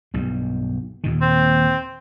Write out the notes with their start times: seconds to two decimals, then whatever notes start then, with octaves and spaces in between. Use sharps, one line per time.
0.14 B1 G2
1.04 D#2 A#2 D#3
1.22 C4